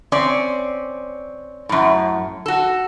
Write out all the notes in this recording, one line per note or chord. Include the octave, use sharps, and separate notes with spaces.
C4 C#4 D5
F#2 A2
F#4 A4